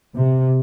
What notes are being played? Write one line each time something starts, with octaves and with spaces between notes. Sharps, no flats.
C3